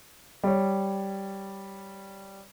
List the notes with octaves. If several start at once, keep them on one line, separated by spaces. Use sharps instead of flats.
G3 C#5